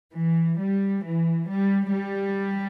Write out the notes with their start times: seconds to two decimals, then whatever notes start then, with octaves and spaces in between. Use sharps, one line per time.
0.14 E3
0.58 G3
1.03 E3
1.48 G3
1.92 G3